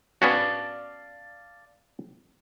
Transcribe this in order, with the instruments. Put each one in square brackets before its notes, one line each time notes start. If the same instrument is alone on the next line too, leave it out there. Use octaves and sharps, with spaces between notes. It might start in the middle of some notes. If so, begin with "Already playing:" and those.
[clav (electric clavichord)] B3 C#4 F#4 [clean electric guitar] D5 F5 A5